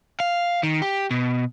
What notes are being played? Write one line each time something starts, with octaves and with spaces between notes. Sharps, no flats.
F5
D#3
G4
B2